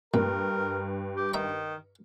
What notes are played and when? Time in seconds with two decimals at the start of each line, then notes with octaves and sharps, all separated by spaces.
0.14 G2 A#2 A#4
1.17 G4
1.33 D#3 E5 A#5 C#6